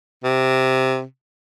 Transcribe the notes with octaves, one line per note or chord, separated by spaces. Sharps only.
C3